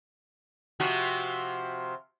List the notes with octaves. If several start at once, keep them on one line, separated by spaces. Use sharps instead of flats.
C3 F3 F#4